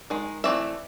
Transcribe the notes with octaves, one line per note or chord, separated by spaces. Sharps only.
D#3 G#3
E3 A3 C4 D5 E5